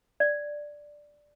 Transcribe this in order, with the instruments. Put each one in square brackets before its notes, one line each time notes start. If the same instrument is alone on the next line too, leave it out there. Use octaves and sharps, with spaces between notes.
[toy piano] D5